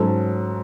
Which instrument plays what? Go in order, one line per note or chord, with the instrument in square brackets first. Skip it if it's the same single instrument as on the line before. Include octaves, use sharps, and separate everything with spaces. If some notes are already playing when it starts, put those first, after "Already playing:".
Already playing: [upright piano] G#2 F#3 C#4 A4